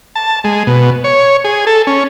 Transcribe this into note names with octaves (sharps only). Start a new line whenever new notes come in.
A5
G#3
B2
C#5
G#4
A4
C#4